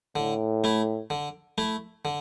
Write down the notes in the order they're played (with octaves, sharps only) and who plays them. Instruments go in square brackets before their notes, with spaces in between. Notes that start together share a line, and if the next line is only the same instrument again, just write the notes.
[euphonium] A2 [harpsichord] D3
[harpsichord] A3 E4
D3
A3 E4
D3